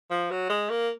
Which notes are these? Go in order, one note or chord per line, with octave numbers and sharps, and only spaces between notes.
F3
F#3
G#3
A#3